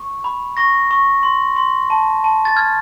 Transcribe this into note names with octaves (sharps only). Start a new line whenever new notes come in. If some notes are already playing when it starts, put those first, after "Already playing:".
Already playing: C#6
B5
C#6 A#6
C#6
C6
C6
A5
A5
A6
F6 G#6